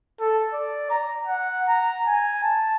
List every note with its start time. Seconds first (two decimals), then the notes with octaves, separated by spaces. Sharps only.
0.20 A4
0.54 D5
0.90 A#5
1.27 F#5
1.68 A#5
2.07 G#5
2.43 A5